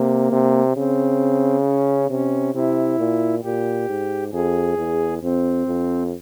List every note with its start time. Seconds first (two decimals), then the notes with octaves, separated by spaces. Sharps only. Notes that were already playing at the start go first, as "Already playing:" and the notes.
Already playing: C3 A#3
0.32 C3
0.76 C#3 C4
1.65 C#4
2.10 C3 C#4
2.55 C3 E4
2.99 A#2
3.44 A#2 G4
3.89 G#2
4.33 F2 G#4
4.77 E2
5.23 F2 C4
5.67 F2